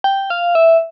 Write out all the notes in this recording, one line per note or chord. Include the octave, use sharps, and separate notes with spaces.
G5
F5
E5